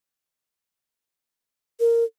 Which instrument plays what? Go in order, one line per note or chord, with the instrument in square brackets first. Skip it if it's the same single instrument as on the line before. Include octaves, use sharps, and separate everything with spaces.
[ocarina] A#4